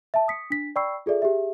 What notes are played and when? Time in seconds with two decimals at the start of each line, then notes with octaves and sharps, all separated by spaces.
0.14 E5 A5
0.28 D#6 B6 C#7
0.50 D4 B6
0.76 D5 G5 B5 C#6 E6 C7
1.06 F4 G#4 A4 D5 E5
1.22 G4 G#4 E5